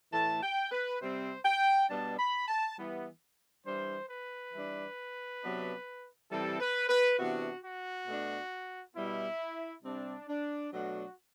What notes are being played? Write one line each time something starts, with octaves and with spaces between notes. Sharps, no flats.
A2 E3 A3 A5
G5
B4
C3 G3 C4 C5
G5
B2 G3 B3 D4 A5
B5
A5
E3 G3 B3
E3 G3 D4 C5
B4
E3 G3 D4
C3 F#3 B3 D4
C3 E3 G3 C4 A4
B4
B4
C3 E3 B3 D4 F#4
F#4
B2 A3 D4
B2 G3 B3 E4
C3 G3 C4 D4
D4
B2 F#3 A3 D4 F#4